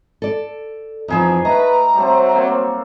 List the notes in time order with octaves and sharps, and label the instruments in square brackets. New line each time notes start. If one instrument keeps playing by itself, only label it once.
[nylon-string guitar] A4 D5
[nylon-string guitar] F2 E3 F3 [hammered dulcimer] D#4 G#4
[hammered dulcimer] A3 [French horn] B4 [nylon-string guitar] D#5 [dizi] A#5
[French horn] F#3 [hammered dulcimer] G3 A3 C4
[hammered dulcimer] A#3 C4 C#5